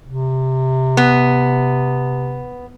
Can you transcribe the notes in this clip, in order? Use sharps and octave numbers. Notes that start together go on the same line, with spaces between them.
C3
B3